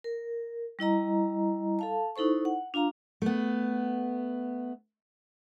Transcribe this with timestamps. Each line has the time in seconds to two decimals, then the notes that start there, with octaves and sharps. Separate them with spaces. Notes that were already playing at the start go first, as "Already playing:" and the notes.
0.04 A#4
0.79 G3 E4 D#5 A#5
1.79 A4 F5 A5
2.16 D#4 E4 A4 C5 C#6
2.45 F#5
2.74 D4 F4 F5 A#5
3.22 A3 B3